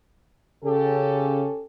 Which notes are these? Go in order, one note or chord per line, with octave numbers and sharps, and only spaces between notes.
C#3 C#4 G4 A4